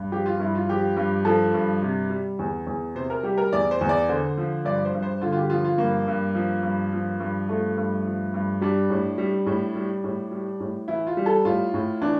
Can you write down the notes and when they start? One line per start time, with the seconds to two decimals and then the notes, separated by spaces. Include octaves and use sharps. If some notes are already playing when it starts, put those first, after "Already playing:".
Already playing: G2
0.12 F3 G4
0.26 F4
0.40 G2 E4
0.55 F4
0.69 F3 G4
0.97 G2
1.25 F3 A4
1.54 G2
1.82 C3
2.10 G3
2.39 E2
2.67 E2
2.95 C3 C5
3.10 A#4
3.23 G3 G4
3.38 A#4
3.53 E2 D5
3.71 C5
3.81 E2
3.89 D5
4.09 D3 C5
4.38 F3
4.65 G2 D5
4.85 C5
4.94 G2
5.03 C5
5.21 D3 F4
5.32 F4
5.37 G4
5.50 F3 F4
5.64 F4
5.78 G2 A#3
6.08 G2
6.35 F3
6.63 G2
6.93 F3
7.20 G2
7.49 F3 A3
7.78 G2
8.05 F3
8.34 G2
8.61 G3 D4
8.90 A2
9.18 G3
9.46 A2
9.75 G3
10.04 A2
10.31 G3
10.60 A2
10.88 E3 E4
11.07 F4
11.17 G3
11.26 A4
11.45 A2 F4
11.74 A2
12.02 E3 D4